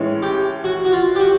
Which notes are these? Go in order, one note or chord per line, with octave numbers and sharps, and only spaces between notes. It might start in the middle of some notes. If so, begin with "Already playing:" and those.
Already playing: A2 E3 G#3 C#4
G4
F#4
F#4
F4
G4
F#4